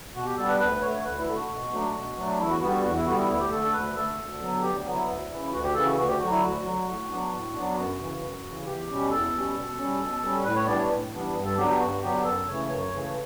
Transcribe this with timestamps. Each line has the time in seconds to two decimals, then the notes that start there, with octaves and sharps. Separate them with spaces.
0.14 B2 F#4
0.26 G4
0.37 G3 B3 D4 A4
0.48 B4
0.60 D2 B4
0.81 D3 A3 C#5
1.04 D2 B4
1.19 E4
1.27 D3 A3
1.34 F#4
1.49 B2
1.72 F#3 A3 D4
1.94 B2
2.16 F#3 A3 D4
2.38 E2 E4
2.50 F#4
2.61 D3 G3 B3 F#4
2.72 F#4
2.83 E2 F#4
2.95 E4
3.05 D3 G3 B3 F#4
3.17 E4
3.28 D2 E4
3.40 G4
3.50 D3 A3 A4
3.62 A4
3.73 D2 B4
3.96 D3 A3 A4
4.18 D2
4.40 D3 F#3 B3
4.62 D2 G4
4.85 D3 F#3 B3
4.93 E4
5.07 D2
5.30 C#3 E3
5.52 D2 F#4
5.64 G4
5.74 C#3 E3 A4
5.85 F#4
5.97 D2 F#4
6.08 G4
6.19 D3 F#3 F#4
6.31 E4
6.41 D2 F#4
6.63 D3 F#3
6.86 A2
7.09 F#3 B3 D4
7.32 A2
7.53 F#3 B3 D4
7.75 F#2 F#4
7.99 C#3 E3
8.20 F#2
8.43 C#3 E3
8.65 E2 G4
8.88 B2 G3 C#4
9.11 E2 A4
9.33 B2 G3 C#4
9.55 B2
9.77 G3 C#4
10.00 B2
10.22 G3 C#4
10.44 A2 B4
10.56 C#5
10.67 E3 G3 B3 D4 D5
10.78 C#5
10.89 A2
11.12 E3 G3 B3 D4
11.35 G2
11.45 A4
11.56 D3 F#3 B3 D4 G4
11.68 G4
11.79 G2 F#4
12.02 D3 F#3 B3 D4 G4
12.23 F#2 A4
12.46 C#3 E3 A3 C#5
12.68 F#2 C#5
12.91 C#3 E3 A3